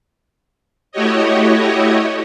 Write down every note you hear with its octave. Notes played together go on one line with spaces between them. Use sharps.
A3 E4 F#4 G4 C#5 D#5